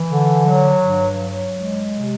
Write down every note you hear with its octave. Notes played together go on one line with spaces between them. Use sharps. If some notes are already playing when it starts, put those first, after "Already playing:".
Already playing: E3
D3
F#3
G2
F#3
G#3
C3